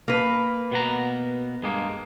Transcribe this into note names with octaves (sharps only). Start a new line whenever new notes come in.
A#3 B4
B2 B3 A#5
G2 G#3 A#3